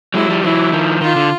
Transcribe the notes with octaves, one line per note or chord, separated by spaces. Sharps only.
F#3 G#3 E4
F3 G3
E3 F#3 E4
D#3 F3
D#3 F4
D3